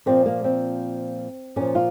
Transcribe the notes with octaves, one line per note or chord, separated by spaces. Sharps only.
A#2 F3 C4
A#3
C4
A#2 F3 C#4
F4